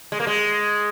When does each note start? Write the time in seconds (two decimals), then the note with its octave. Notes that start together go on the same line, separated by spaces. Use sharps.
0.12 G#3
0.20 A#3
0.27 G#3